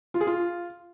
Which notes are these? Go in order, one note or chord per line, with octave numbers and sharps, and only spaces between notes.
F4
G#4
F4